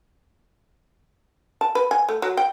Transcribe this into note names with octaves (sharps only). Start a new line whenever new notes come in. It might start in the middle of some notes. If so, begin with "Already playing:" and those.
A5
B4
G#5
A3
F#3
G5